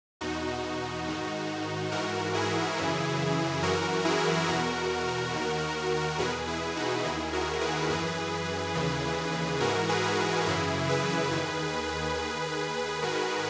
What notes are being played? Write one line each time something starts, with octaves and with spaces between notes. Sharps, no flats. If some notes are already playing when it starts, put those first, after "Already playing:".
E2 B2 D#4 F#4
G#2 D#3
G#2 E3 F#4 A#4
E4 G#4
F#2 C#3 E3
F#2 E3 F#4 A#4
E4 G#4
E2 B2 F#4 A#4
D#2 D#3
E2 B2 G#4 B4
E4 G#4
D#4 F#4
D#2 D#3 E4 G#4
F#4 A#4
G#4 B4
F#2 E3 G#4 B4
D#2 C#3 E3
G#2 E3 F#4 A#4
G#4 B4
F#2 C#3 E3 E4 G#4
G#4 B4
D#2 D#3
D#2 D#3
G#2 D#3 F#4 A#4